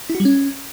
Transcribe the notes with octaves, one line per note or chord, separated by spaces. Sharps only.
E4
F#4
G3
C#4